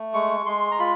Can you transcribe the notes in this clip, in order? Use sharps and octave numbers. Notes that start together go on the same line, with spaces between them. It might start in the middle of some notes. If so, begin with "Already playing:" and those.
Already playing: A3
G#3 C#6
G#3 C6
A#5
F4 B5